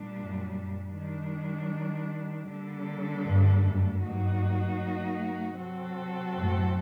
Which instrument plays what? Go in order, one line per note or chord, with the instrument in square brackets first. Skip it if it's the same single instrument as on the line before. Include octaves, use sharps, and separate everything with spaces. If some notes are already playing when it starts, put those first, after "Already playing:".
Already playing: [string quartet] A#2 G3 D4
[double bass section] F#2
[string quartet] D#3 G3 D4
D3 G3 A#3 D4 A4
[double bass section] G2
F#2
[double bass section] G2 [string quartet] F#3 A#3 D#4 F#4
[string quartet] C3 F#3 C4 F#4 A4
[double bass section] F#2 A2